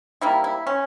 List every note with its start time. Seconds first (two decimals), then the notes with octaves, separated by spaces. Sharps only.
0.21 C3 G3 A#3 E4
0.44 E4
0.67 C#4